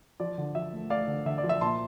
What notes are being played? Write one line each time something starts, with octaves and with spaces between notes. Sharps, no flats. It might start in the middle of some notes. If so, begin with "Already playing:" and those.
F3 D5
D3
F3 E5
A3
A3 D5 F5
D3
D3 E5
D5
F3
E5
A#2 A5 C6